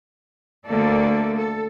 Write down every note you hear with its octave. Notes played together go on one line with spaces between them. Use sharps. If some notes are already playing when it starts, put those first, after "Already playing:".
D2 D3 A3 A#3 A4 D5
A4